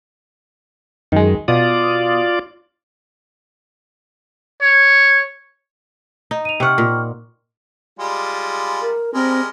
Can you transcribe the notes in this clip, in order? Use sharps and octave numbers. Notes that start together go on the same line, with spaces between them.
F#2 D#3 G#3
B2 F4 D5 D#6
C#5
D#4
D#7 F7
C3 F#5 G5 C#6 F6
A#2
G3 G#3 F4
A#4
G3 G#3 C4 A#4